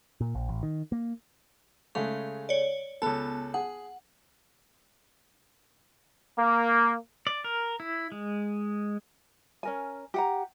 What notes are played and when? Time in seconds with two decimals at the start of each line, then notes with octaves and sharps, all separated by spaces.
0.20 A#2
0.35 A#1
0.49 A1
0.63 D#3
0.92 A#3
1.95 C#3 G#3 A3 F5
2.49 C#5 D5
3.02 C#2 B3 A4 A5
3.54 G#4 F#5
6.38 A#3
7.27 D5
7.44 A#4
7.80 E4
8.12 G#3
9.63 C#4 A#4 G#5
10.14 G4 F#5 A#5